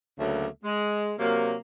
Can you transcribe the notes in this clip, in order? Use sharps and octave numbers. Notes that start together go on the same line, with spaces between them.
D2 C#3 F#3 A3 A#3
G#3
C3 F#3 A#3